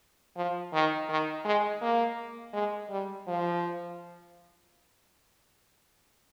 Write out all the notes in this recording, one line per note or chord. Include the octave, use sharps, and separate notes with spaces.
F3
D#3
D#3
G#3
A#3
G#3
G3
F3